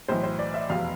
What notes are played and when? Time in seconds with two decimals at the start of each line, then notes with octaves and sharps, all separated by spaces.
0.08 B1 A2 E3 C5
0.23 C5
0.39 D5
0.54 E5
0.69 F1 E2 B2 F5